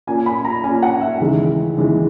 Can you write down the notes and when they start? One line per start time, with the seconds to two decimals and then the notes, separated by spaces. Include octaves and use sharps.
0.07 A#2 A#3 C#4 G#5
0.26 B5
0.45 A#5
0.64 A#2 A#3 C#4 G#5
0.83 F#5
1.01 E5
1.20 D#2 C#3 E3 G#3
1.77 D#2 C#3 E3 G#3